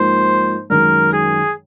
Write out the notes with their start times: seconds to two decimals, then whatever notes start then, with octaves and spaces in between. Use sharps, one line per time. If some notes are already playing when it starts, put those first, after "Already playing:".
Already playing: G#2 F3 A#3 D#4 C5
0.70 F#2 D#3 G#3 A#4
1.13 G#4